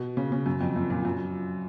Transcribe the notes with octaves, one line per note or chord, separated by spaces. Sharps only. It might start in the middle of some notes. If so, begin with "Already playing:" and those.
Already playing: B2
C#3
C#3
F#2
F2
F#2
A#2
F#2